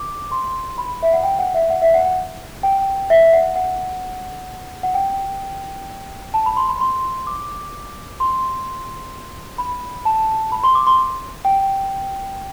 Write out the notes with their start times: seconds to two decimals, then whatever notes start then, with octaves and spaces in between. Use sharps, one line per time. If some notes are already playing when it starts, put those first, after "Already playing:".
Already playing: D6
0.32 C6
0.78 B5
1.03 E5
1.13 F#5
1.23 G5
1.39 F#5
1.54 E5
1.70 F#5
1.82 E5
1.94 F#5
2.05 F#5
2.63 G5
3.10 E5
3.33 F#5
3.56 F#5
4.83 F#5
4.94 G5
6.34 A5
6.46 B5
6.57 C6
6.69 B5
6.81 C6
7.27 D6
8.20 C6
9.58 B5
10.05 A5
10.52 B5
10.64 C6
10.75 D6
10.87 C6
11.45 G5